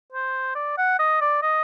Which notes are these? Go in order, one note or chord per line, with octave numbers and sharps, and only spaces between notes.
C5
D5
F#5
D#5
D5
D#5